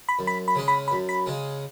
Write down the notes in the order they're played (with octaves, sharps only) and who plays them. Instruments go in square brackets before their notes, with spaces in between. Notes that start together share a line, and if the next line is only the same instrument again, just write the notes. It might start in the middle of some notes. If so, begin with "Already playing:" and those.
[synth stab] B5
[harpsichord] F#2
[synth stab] B5
B5
[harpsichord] C#3 G#3 C#4
[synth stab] B5
[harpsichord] F#2 [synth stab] B5
[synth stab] B5
[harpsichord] C#3 G#3 C#4